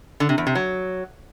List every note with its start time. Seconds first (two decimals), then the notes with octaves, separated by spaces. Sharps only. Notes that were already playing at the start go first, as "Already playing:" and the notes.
0.20 D3
0.29 C3
0.38 E2
0.47 C3
0.55 F#3